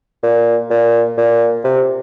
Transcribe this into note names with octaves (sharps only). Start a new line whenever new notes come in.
A#2
A#2
A#2
C3